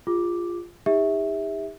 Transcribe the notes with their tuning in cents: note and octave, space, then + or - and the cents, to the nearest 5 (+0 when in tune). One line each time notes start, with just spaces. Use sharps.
F4 -5 G#4 -45 D6 +0
D#4 +30 G4 +40 E5 -20